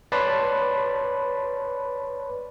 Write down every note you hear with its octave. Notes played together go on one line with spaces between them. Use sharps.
B4 C#5 D5 A5 B5 C6